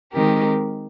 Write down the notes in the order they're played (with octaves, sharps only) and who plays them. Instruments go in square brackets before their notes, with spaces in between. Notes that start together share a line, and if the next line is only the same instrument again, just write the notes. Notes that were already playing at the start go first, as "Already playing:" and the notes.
[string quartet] D#3 G#3 C4 G4 A#4